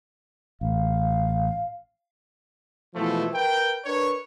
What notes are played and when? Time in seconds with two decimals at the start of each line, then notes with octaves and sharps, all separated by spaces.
0.61 A1 F5
2.95 B2 E3 F3 G#3 A3
3.33 A#4 B4 G5
3.85 D4 A#4 B4 C#5